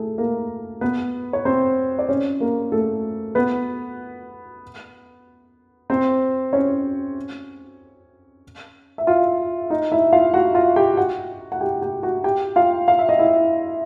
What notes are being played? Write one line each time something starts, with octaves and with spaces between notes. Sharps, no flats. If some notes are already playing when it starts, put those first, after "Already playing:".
Already playing: A3 G#4 A4
A#3 A#4
B3 B4
C#5
C4 C5
D5
C#4 C#5
A#3 A#4
A3 A4
B3 B4
C4 C5
C#4 C#5
E5
F4 F5
D#4 D#5
E4 E5
F4 F5
F#4 F#5
F4 F5
G4 G5
F#4 F#5
F#5
G4 G5
G4 G5
F#4 F#5
G4 G5
F4 F5
F5
E5
D#5
E4 E5